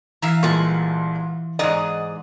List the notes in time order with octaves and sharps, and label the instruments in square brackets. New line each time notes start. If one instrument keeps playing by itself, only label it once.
[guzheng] E3 E5 F5 [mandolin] A#5 E6
[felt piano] C2 A#2 G#3 [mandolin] F4 B4 C#6
[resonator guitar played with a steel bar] G#2 D#5 [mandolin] G#4 A#5 D#6 [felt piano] D5